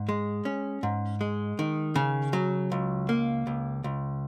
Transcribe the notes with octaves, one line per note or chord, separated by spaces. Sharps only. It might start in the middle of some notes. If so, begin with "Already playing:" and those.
Already playing: G#2
G#3
C#4
G#2
G#3
D#3
C#3
F#3
C#2
A#3
C#2
C#2